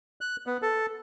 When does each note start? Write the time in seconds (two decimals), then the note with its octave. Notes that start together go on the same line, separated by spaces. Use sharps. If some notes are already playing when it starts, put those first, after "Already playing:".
0.21 F#6
0.46 B3
0.62 A4